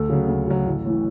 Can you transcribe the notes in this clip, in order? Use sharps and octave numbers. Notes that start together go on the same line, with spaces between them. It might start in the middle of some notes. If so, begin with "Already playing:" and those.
Already playing: D2 A4
C#3 F#3
D2
C#3 F#3
A1
A2 E3